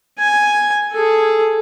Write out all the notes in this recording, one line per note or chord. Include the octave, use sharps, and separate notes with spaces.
G#5
G#4 A4